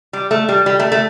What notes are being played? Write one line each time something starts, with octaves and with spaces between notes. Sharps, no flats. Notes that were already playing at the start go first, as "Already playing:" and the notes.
G3
A3
G3
G3
A3
A3